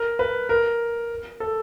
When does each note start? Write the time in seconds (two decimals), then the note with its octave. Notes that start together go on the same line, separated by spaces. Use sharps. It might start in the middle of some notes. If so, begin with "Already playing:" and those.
Already playing: A#4
0.19 B4
0.49 A#4
1.40 A4